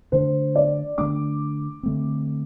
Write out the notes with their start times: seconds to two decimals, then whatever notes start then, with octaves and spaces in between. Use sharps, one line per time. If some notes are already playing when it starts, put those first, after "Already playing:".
0.12 D3 A3 D4 C5
0.56 D5
0.98 D3 A3 D4 D6
1.83 D3 A3 C4